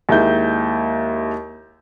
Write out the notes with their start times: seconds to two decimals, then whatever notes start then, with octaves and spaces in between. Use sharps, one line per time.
0.09 D#2 G#3 E4 G6